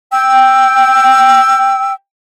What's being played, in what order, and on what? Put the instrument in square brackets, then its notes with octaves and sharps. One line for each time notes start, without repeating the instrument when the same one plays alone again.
[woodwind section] G5 [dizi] E6